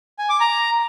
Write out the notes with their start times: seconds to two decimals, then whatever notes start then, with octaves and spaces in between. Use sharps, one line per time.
0.19 G#5
0.29 D6
0.40 A#5